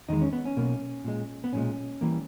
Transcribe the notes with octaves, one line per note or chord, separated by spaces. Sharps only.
E2 D#3 G#3 D#4
C#4
B3
C#4
B1 B2 A#3
A#2 G#3
B3
B1 A#2 G#3 C#4
E3 G3 A#3